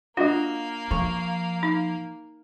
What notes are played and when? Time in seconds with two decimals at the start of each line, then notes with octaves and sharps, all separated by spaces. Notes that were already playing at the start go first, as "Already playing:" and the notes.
0.17 A#3 D4 F4 F#4 D#5 F5
0.91 F3 C#6
1.63 D#4